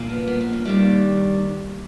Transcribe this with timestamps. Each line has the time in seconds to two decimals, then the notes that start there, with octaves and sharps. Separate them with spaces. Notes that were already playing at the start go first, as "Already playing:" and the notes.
Already playing: A#2 F3 A#3
0.09 B3
0.27 B3
0.41 C4
0.53 C#4
0.65 D#2 D#3 G3 D4